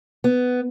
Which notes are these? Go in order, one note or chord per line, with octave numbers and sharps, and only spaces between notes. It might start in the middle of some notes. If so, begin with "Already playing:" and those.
B3